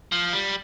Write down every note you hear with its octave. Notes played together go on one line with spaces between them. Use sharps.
F3
G3